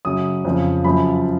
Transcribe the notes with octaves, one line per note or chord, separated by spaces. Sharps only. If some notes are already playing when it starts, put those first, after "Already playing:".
F#2 C#3 F#3 D#6
F2 C#3 F3
F#2 C#3 F3 B5